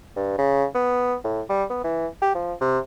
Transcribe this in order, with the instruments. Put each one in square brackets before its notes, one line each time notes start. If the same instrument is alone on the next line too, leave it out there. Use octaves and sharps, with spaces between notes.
[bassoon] G2
C#3
B3
A2
G3
B3
E3
G4
F3
C3